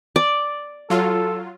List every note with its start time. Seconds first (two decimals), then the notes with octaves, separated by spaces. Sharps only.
0.16 D5
0.90 F#3 F4 A4